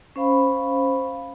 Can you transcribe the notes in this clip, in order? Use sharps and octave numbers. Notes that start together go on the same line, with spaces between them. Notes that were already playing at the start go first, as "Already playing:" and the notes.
C#4 C5 F5 B5